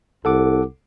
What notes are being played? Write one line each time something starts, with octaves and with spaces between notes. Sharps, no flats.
C2 A4 F#5 D6